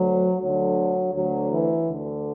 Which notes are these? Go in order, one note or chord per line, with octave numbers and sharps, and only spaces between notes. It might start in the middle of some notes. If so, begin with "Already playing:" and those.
Already playing: D2 D3 F#3
D2 D3 F#3
D2 D3 F#3
E3
D2 D3